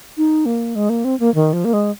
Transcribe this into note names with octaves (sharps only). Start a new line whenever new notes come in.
D#4
A#3
G#3
A#3
C4
A#3
D#3
F3
A#3
G#3